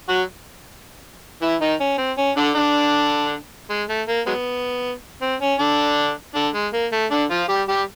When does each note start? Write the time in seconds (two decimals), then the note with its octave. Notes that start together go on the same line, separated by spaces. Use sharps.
0.09 F#3 F#4
1.42 E3 E4
1.61 D#3 D#4
1.80 C#4
1.98 C4
2.18 C#4
2.37 D3 D4
2.55 D3 D4
3.70 G#3
3.89 A3
4.08 A#3
4.27 F#3 G#3 B3
5.22 C4
5.41 C#4
5.59 D3 D4
6.35 D3 D4
6.54 G#3
6.73 A#3
6.92 A3
7.11 D3 D4
7.30 F3 F4
7.48 G3 G4
7.69 G3 G4